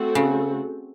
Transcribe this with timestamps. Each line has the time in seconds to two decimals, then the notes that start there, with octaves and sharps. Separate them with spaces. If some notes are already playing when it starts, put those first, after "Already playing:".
Already playing: A3 C4 F#4 A4
0.15 C#3